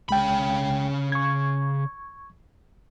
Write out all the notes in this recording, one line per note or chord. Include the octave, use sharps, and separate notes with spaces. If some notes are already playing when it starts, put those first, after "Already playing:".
C2 C#3 G#3 G5 B5
C#6 G#6